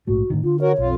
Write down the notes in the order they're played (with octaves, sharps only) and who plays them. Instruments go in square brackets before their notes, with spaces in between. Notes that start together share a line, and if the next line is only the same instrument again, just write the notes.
[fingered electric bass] A#1 G#2 A3 [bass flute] F#4
[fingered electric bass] A2 D3 D#3
[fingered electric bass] D3 [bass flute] F4
[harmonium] F#4 A#4 [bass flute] C#5
[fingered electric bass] B1 [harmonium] F2 F4